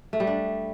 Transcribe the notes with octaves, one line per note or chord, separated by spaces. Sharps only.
A3
G3
D4